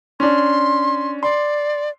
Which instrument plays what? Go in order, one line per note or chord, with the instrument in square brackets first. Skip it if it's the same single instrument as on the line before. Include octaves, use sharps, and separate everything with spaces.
[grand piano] C#4 D4 [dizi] C6
[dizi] D5 [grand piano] C6